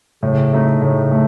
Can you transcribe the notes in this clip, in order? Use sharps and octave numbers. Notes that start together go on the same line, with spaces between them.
A2 C#3
A3 D#4
A2 C#3
A3